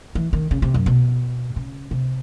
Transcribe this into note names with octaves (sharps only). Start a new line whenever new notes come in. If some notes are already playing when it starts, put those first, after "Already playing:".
E3
D#3
C#3
C3
F#2
B2
C#3
C3